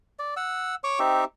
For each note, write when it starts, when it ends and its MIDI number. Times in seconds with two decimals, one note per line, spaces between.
0.19 0.34 74
0.37 0.75 78
0.37 0.75 88
0.84 0.99 73
0.84 0.99 85
0.84 0.99 86
0.99 1.24 60
0.99 1.24 63
0.99 1.24 67
0.99 1.24 76